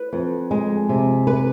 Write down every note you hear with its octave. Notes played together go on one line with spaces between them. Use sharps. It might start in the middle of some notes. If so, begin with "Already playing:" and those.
Already playing: B4
F2
G#3
C3
B4